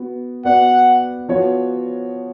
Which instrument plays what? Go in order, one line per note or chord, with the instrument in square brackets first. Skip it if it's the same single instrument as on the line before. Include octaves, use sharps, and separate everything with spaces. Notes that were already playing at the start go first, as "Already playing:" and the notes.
Already playing: [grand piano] B3 F#4
[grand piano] B3 F#4 B4 D5 [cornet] F#5
[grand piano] F3 B3 F#4 C#5